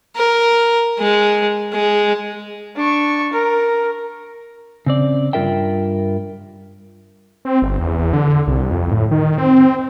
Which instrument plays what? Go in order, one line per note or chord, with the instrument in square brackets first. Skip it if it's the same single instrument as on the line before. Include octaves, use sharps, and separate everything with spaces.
[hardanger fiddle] A#4
G#3
G#3
[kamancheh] D4 C#6
A#4
[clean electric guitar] C#3 C4 D5
G2 E3 F4 A#4 E5 G5
[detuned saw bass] C4
G1
E2
E2
D3
C2
F2
A2
D#3
C4